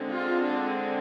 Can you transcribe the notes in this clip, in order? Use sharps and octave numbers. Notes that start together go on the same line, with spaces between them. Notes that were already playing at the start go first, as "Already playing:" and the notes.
Already playing: D3 G#3 C4
F4
D4